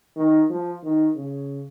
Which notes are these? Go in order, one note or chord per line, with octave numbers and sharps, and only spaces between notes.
D#3
F3
D#3
C#3